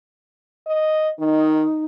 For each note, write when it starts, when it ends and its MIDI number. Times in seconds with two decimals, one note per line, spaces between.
0.67 1.09 75
1.19 1.64 51
1.19 1.85 63